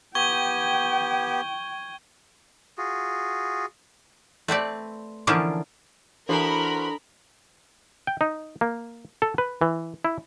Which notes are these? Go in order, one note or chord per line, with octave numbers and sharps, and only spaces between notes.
B3 G4 G5 C#6 G#6 G7
F4 F#4 G#4
A3 C4 B4 D5
D3 E3 F3 A#3 C#4 D4
E3 D4 F#4 A4 A#4 C5 B5
G5
D#4
A#3
A4
B4
E3
E4